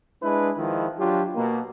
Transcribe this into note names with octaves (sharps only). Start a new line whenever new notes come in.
G#3 D4 E4 B4
D#3 F3 G#3 E4
F#3 D4 F4 G4
B2 A#3